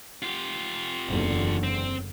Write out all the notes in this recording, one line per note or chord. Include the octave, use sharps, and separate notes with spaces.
F4 G4
F#1 E2 D3
C4